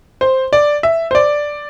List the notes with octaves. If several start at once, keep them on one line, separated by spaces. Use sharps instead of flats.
C5
D5
E5
C5
D5